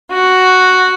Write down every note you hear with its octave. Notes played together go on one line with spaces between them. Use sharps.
F#4